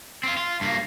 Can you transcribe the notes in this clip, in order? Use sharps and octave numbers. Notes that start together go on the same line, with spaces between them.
C4 F4
F4
G2 A#3